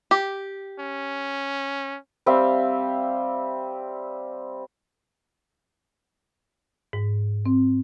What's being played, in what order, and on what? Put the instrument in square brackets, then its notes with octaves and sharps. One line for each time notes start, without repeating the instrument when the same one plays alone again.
[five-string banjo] G4
[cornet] C#4
[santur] G3 C4 E5 F5
[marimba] G#2
C4